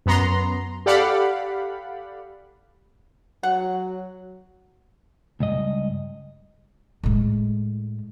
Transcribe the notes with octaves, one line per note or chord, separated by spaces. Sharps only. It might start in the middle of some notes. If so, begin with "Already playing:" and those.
F#2 B3 A#5 C6
G4 A4 D5 F5 F#5 B5
F#3 F#5
C#2 G2 D#5
A2 G#3